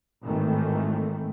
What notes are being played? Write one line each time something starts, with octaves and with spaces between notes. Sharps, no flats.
G#1 A2 D#3 E3 A3